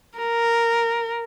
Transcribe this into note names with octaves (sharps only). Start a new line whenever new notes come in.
A#4